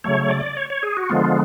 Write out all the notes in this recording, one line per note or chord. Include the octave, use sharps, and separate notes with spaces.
C#3 F#3 A3 C#5
D5
C#5
C#5
G#4
F#4
D3 F3 G#3 B3 F4